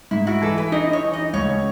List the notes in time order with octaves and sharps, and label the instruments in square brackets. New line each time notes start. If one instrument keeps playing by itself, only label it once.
[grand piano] G#2 [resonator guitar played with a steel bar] E4
[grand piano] E4 [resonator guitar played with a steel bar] F#4
[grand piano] E3 [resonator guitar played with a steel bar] A4
[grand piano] E4 [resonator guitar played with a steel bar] B4
[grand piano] D#4 [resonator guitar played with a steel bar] D#5
[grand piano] D#4
[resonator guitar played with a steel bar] C#5
[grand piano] E3
[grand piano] D#4 [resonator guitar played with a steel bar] D#5
[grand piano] C#2 [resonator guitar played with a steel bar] C#5
[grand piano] C#4